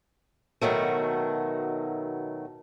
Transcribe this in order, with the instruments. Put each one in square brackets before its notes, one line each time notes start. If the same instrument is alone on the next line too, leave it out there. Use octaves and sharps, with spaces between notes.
[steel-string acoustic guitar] B2 D#3 F#3 A3